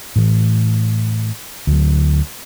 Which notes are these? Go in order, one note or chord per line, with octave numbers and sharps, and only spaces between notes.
A2 E3
D2 F#3